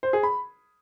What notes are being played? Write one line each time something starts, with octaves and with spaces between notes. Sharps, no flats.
C5
G#4
B5